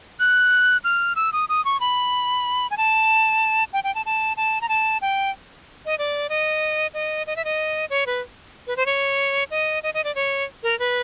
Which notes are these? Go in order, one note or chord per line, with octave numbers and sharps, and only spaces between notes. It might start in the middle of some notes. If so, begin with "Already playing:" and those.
F#6
F6
E6
D#6
D#6
C#6
B5
G#5
A5
G5
G5
A5
A5
A5
A#5
A5
G5
D#5
D5
D#5
D#5
D#5
E5
D#5
C#5
B4
B4
C5
C#5
D#5
D#5
D#5
D5
C#5
A#4
B4